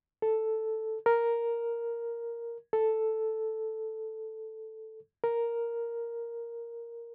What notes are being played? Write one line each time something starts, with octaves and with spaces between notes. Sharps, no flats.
A4
A#4
A4
A#4